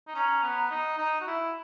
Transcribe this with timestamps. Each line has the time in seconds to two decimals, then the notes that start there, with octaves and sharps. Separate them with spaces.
0.07 D#4
0.15 C#4 A#5
0.43 B3
0.71 D#4
0.98 D#4
1.21 F#4
1.27 E4